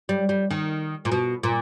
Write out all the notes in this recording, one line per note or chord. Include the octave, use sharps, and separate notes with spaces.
G3
G3
D#3
A#2
B2
A#2